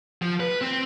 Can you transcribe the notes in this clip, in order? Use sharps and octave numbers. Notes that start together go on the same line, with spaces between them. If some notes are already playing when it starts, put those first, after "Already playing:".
F3
B4
C4